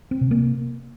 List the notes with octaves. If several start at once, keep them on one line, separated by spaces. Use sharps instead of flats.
C4
C3
A#3